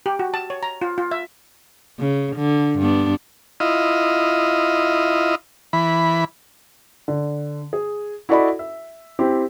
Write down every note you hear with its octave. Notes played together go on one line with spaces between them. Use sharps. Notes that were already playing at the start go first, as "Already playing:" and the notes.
G4
F#4
A5
C#5
A#5
F4
F4
E5
C#3
D3
G2 B3 D4
E4 F4 D#5
E3 B5
D3
G#4
E4 F#4 A4 D5 D#5 B5
E5
C4 E4 G4